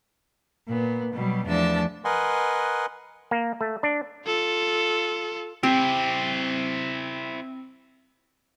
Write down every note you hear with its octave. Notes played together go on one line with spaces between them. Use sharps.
A#2 B3
B2 F#3 G3
E2 F3 A3 D4 A5 E6
A#4 B4 D#5 F#5 G#5 C6
A#3
A3
D4
F4 A4
C4 E4 G4 C5